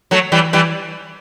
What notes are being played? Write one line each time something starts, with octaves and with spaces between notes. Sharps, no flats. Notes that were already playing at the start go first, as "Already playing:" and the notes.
F#3 A3
E3 G3
E3 G3